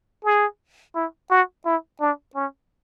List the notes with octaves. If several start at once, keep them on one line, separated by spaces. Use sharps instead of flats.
G#4
E4
F#4
E4
D4
C#4